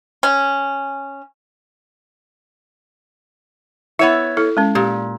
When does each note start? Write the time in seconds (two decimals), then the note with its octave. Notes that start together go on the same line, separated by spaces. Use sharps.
0.23 C#4
3.99 B3 E4 C#5 E5 F#5
4.37 E4 A4
4.57 G#3 C#4
4.75 A#2 G4